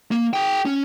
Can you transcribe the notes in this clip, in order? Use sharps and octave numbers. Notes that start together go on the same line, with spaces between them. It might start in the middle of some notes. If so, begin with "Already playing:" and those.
A#3
G#4 G5
C#4